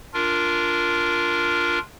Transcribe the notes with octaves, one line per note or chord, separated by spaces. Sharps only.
D4 F4 A#4